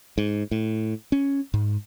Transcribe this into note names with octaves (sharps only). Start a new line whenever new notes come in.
G#2
A2
C#4
G#2